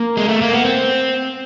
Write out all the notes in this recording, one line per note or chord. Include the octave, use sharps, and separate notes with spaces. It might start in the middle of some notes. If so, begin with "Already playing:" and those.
Already playing: A#3
G#3
A3
A#3
B3
C4